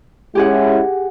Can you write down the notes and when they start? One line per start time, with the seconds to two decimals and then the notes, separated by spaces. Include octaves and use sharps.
0.35 G#3 C#4 E4 G4 G#4 F#5